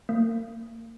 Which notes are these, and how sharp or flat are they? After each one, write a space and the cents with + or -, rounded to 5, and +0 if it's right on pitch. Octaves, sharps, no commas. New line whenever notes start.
A#3 -35